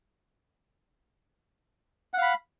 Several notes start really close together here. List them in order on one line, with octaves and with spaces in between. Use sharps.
F#5 F5 B5